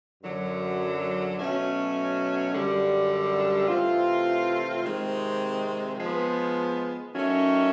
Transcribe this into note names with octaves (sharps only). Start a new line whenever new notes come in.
F#2 D3 F#3
B2 F#3 A3 C#4
F#2 D3 G3
C3 E3 A3 C4 F4
C3 D#3 G#3 C4
F3 G#3 B3
D#3 F#3 A3 C#4